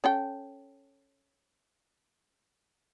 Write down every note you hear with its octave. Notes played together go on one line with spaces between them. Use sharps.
C#4 A4 G5